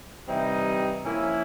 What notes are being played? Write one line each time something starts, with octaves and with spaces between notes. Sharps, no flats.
C3 E3 G3 C4 D#4
F3 A#3 C#4 E4